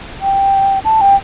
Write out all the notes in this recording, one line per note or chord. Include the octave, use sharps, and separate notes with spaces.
G5
A5
G5